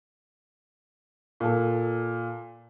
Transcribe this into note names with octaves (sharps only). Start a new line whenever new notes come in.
A#2 A4